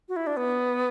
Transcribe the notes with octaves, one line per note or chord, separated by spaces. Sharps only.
F#4
E4
D4
B3